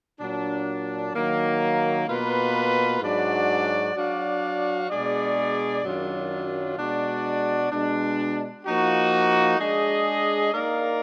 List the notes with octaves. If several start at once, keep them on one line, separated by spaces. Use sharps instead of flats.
A#2 F#3 D4
D#3 F#3 A#3
B2 A#3 F4 B4
G#2 F#3 D4 F#4 D5
F#3 D4 F#4 D5 F5
B2 G#3 D4 G#4 D5
F#2 D#3 F#3 D4 F4
B2 G#3 D4 F#4 D5
B2 G#3 D4
F3 A#3 D#4 F#4
G#3 D4 G#4 D#5
A#3 D#4 A#4 D5 F5